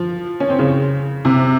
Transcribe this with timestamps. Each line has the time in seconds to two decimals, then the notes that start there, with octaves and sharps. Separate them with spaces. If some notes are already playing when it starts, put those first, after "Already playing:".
Already playing: F3
0.40 C#4
0.50 C4
0.59 C#3
1.25 C3